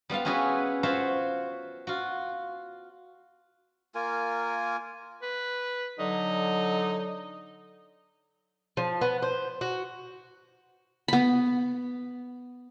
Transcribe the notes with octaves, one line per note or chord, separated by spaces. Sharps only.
G3 B3 F4 F5
C#4 E4 F#4 G#4 B4 C#5
F4 F#4 C5 C#5 E5 F#5
F4 F#4
A#3 F4 A#4 G#5
B4
D3 F#3 D#4
F3
B3
C5
F#4
B3 B5